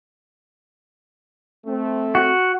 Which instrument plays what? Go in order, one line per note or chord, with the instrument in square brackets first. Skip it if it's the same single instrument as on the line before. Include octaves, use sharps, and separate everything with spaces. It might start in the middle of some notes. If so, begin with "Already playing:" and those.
[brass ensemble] A3 C4
[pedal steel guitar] F#4